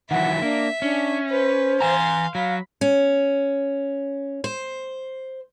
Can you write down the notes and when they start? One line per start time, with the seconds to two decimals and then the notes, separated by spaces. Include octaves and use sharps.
0.11 D#3 E3 F#3 E5 F#5
0.42 A#3 D4
0.82 C#4 D4
1.30 B4 C5
1.81 E3 F5 G#5 A#5 C6
2.35 F#3 F5 B5
2.81 C#4
4.44 C5